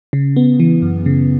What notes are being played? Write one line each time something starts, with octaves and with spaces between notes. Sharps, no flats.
C#3
B3
E3
F#2
C#3